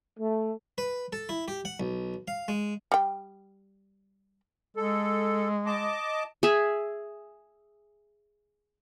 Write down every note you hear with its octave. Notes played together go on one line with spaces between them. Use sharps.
A3
B4
A4
E4
G4
F#5
B1
F5
G#3
G3 G5
G#3 A4
D#5 A5 D6
G#4 E5